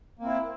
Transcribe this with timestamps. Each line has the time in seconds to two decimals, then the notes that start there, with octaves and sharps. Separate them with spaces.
0.19 A#3
0.22 C4
0.26 E4